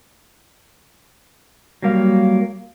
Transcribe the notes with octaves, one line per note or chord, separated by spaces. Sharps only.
F#3 G3 A#3 F5